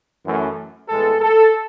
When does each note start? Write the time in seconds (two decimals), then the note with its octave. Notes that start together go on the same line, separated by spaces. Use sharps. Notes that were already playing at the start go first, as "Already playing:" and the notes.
0.24 F#2 E3 A3
0.89 A2 E3 G#3 B3 A4
1.21 A4